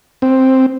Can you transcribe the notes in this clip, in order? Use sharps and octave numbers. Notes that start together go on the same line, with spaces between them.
C4